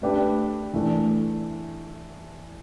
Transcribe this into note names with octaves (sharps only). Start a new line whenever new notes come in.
A3 D4 G4 B4
E3 A3 D4